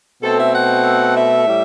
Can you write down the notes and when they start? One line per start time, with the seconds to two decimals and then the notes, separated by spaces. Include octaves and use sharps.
0.23 B2 A3 C4 A4
0.39 E5
0.54 F#5
1.16 E5
1.47 A2 G3